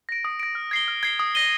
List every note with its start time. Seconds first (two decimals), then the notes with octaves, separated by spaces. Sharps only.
0.09 A#6 D7
0.25 D#6
0.40 A#6 D7
0.55 F6
0.71 G#6 C7 G7
0.88 F6
1.03 G#6 C7 G7
1.20 D#6
1.35 A#6 D#7 G7